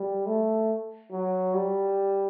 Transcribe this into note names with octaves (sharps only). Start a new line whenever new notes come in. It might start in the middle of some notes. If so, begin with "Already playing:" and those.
Already playing: G3
A3
F#3
G3